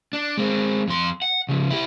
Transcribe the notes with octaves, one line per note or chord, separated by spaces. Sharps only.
D4
G#3 C4
F2 C6
F#5
C#3 F3
E4 G4